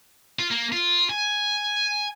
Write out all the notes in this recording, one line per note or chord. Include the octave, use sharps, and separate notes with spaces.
F4
A#3
F4
G#5